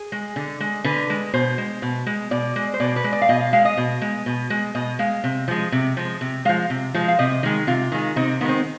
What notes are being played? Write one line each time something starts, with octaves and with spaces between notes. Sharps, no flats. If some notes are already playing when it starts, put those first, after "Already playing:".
Already playing: G#4
G#3
D3
G#3
D3 B4
G#3
B2 C5
G#3
B2
G#3
B2 D5
G#3
C5
B2 D5
B4
G#3
D5
F5
B2 D#5
F5
G#3 F5
D#5
B2
G#3
B2
G#3
B2 D#5
G#3 F5
C3
F3 G#3
C3
F3 G#3
C3
F3 G#3 F5
C3
F3 G#3
F5
C3 D#5
D#3 G#3
C3 F4
D#3 G#3
C3 D#4
D#3 G#3 B3 C4